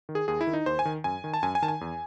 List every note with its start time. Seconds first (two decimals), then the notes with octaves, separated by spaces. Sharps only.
0.09 D#3
0.15 G#4
0.28 D#2 G#4
0.41 E4
0.47 D#3
0.53 D#4
0.66 D#2 C5
0.79 G#5
0.85 D#3
1.04 F#2 G#5
1.24 D#3
1.34 A5
1.43 F#2 G#5
1.55 G#5
1.62 D#3 A5
1.68 G#5
1.81 E2